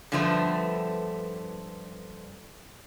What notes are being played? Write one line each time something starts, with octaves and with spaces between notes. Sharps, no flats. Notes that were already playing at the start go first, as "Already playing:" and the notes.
G2 D3 F3 A3 B3